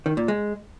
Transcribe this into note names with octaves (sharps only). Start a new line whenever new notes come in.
D#3
A#2
G#3